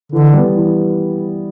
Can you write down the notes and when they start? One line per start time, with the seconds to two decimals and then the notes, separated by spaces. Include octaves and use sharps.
0.12 D3 E3
0.34 G3 B3
0.56 E3